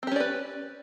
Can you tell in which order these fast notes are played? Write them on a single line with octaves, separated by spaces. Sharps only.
C4 G4 C#4 D5 B4